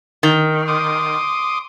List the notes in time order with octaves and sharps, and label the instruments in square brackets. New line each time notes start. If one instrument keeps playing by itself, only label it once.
[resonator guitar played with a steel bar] D#3
[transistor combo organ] C6 D6 D#6